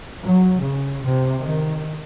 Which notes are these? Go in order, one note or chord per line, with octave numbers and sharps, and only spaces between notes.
F#3
C#3
C3
D#3